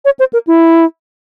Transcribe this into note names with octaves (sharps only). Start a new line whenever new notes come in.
C#5
C5
A#4
E4